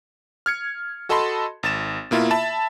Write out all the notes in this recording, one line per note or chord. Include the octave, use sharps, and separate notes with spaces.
F6 G#6 C#7
F#4 A4 D#5 A5 B5 C6
G#1 A6 E7
B2 A#3 E4 F4
E5 A5 B5